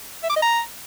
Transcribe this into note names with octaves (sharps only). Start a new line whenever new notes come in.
E5
D6
D#5
A#5